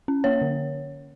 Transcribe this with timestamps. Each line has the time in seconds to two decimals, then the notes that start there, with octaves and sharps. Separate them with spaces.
0.08 C#4
0.24 A#3 C#5
0.42 D3